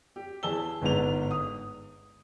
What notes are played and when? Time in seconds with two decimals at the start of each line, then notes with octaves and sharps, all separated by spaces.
0.16 G4
0.43 E2 G#4 A5 E6 G7
0.82 G1 G#2 B3 F7
1.31 D#6